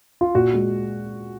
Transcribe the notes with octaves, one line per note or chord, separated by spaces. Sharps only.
F4
A#2 F#4
G#3